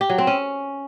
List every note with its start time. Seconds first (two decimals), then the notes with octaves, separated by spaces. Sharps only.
0.01 G4
0.10 F#3
0.18 C4
0.27 C#4